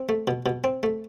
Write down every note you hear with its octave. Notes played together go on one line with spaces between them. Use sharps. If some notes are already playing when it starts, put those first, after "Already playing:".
Already playing: C4
A3
B2
B2
C4
A3